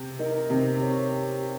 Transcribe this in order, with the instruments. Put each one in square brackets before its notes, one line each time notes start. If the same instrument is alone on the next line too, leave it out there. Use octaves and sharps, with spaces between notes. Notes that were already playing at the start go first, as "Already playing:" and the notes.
Already playing: [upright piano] C3
[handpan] D#4 A#4 D#5
[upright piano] C3 [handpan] C4
[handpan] G4 C#5
C4
G4